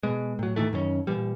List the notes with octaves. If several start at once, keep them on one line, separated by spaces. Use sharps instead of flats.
B2 G#3
A2 F#3
A2 D#3 E3 A3
F#2 D#3 B3 C#4
A#2 E3 G3